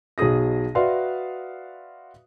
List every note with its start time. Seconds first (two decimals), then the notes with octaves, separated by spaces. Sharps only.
0.18 B1 B2 G#4 D#6 A#6
0.75 F#4 B4 D5 E5 F5 C6